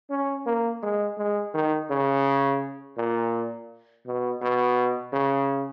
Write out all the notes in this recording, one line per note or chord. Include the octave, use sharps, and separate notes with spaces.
C#4
A#3
G#3
G#3
D#3
C#3
A#2
B2
B2
C#3